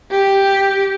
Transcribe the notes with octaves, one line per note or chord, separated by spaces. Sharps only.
G4